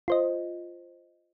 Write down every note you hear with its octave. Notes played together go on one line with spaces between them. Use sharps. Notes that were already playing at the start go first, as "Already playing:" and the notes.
F4 C5 D#5